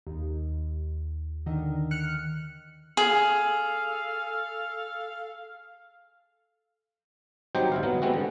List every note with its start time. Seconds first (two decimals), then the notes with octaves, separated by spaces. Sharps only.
0.07 D#2
1.46 D3 D#3
1.91 F6 F#6 C#7
2.97 G#4 A4 F5
7.55 F#3 G3 C4 D#4 G4 C5
7.72 G1 E4 F5
7.83 F#3 B3
8.02 G3 G#3 B3 C4 E4 F#4
8.14 D3